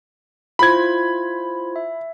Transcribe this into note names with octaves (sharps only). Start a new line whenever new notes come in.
E4 F4 C5 B5 G#6
E5